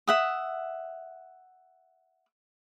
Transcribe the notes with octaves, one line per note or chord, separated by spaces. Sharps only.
E5 F#5 D#6